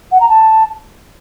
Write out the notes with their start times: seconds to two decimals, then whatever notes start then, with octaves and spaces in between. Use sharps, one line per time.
0.12 F#5
0.21 A#5
0.29 A5